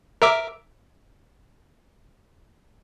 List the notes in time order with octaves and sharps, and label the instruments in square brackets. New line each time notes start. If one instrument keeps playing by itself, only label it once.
[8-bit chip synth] A#4 E5 D6